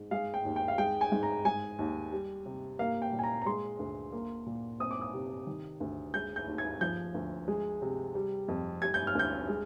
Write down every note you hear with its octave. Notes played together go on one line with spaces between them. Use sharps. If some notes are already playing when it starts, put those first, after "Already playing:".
Already playing: G#2
G#3 F5
G5
D#2
G5
F5
G#3 G5
G#5
G#2
A#5
G#3 G#5
D#2
G3
C3
A#3 F5
G5
A#2
G#5
A#5
A#5
G#3 C6
D2
A#3
A#2
C4 D#6
D6
D#6
C3
D#3
D2
G#3 G6
G6
D#2
G#6
F3 G6
D2
G#3
C3
G3
F2
G3 G#6
G6
F6
D2 G6
G#3